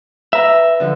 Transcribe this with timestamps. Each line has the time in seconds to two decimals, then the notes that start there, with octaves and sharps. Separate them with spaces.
0.33 B4 E5 A#5
0.80 D3 F3